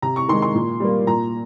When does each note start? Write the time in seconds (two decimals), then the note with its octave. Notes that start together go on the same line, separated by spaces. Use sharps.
0.02 C3 A#5
0.16 C#6
0.28 D#3 G#3 C6
0.42 C6
0.55 A#2
0.80 G3 A#3
1.07 A#2 A#5